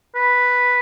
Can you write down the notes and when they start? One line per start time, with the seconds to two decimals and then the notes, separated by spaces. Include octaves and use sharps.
0.15 B4